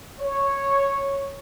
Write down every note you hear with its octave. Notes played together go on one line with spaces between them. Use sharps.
C#5